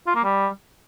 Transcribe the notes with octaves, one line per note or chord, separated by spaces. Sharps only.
F4
A#3
G3